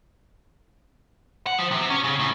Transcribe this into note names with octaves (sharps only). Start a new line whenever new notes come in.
F#5
F3
C3
C#4
C#3
A2